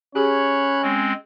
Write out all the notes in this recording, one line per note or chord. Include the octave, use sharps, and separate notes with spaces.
C#4 G4 G#4 C#5 B5 F#6
G#3 C4